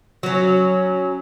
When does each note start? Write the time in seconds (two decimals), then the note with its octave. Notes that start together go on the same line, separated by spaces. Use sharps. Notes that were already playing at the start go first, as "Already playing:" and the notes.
0.23 F#3 C#4